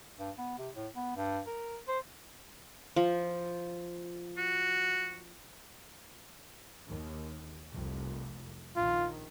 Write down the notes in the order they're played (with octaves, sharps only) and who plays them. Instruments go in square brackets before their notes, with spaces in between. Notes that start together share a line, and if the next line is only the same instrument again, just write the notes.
[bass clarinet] G2
B3
C3
A2
B3
G2
A#4
C5
[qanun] F3
[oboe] F#4
[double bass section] D#2
F1 C2 F2
[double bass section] A#1 D#3 [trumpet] F4